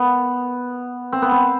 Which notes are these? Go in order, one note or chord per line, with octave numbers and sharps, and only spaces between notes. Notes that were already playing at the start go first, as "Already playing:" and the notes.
Already playing: B3
C4
B3
C4